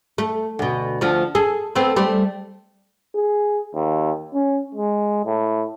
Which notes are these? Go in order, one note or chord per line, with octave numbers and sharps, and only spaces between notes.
A3
D2 B2
D2 F3 A3
G#4 A4
A3 B3 C4
G3 A3 C4
G#4
D#2
C#4
G#3
A2